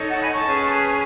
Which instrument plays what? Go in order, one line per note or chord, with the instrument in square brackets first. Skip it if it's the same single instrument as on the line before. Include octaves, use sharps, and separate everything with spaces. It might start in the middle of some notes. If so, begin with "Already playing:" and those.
Already playing: [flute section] D#4 A4 C#5
F#5 A5
G#5 B5
A5 C#6
C#4 G#4 B4